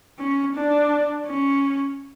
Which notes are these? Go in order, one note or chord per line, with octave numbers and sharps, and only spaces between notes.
C#4
D4
C#4